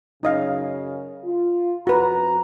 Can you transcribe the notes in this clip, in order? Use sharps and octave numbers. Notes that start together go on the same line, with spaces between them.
F#2 C#3 D#4 D#5 F5
F4
F2 F#4 B4 A#5